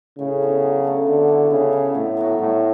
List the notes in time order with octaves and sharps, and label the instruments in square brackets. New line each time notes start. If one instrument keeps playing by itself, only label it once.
[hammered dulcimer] A2 [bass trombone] C#3
[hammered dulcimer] E3 B3 D4
F#3
A3 D4 A4
[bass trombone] D3 [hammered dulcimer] B3
[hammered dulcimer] E4 A4 C#5
[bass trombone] C#3 [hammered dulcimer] B3
[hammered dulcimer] E4 G4
[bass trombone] A2 [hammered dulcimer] D3
[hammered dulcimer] F#3 B3 F#4
[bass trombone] A2 [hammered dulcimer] G3